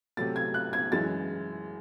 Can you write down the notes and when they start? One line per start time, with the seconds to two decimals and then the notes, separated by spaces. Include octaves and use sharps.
0.17 C3 F#3 A3 A6
0.36 G#6
0.54 F#6
0.73 G#6
0.92 F#2 E3 G#3 A6